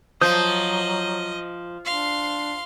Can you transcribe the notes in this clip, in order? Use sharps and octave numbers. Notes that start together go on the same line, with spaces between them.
F3 F#3 D#5 D#6 G6
D4 F5 C6